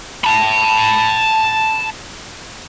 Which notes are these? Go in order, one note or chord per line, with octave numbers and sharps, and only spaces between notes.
A5 B5